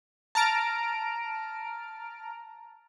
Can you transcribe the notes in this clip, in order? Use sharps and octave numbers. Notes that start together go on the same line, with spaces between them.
A5 A#5 F6 D7